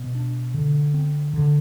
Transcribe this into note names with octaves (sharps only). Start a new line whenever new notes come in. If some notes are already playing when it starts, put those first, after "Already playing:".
Already playing: B2
D4
D3
C4
D3